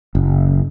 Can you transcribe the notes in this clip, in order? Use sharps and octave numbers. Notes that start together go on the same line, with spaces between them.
F#1